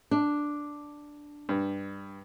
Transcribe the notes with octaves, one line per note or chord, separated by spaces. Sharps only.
D4
G2